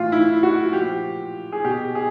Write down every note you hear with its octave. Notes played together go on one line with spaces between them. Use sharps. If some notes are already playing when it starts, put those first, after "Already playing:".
Already playing: A2 E3 F4
E4
F#4
A#2 F3 G4
G#4
B2 G4
G#4